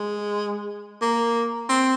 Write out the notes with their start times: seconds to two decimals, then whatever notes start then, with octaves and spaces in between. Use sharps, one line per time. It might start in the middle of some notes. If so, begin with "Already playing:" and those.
Already playing: G#3
1.02 A#3
1.69 C4